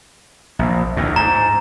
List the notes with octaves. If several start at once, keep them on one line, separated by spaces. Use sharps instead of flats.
A#1
D2 A2
G#2 A#5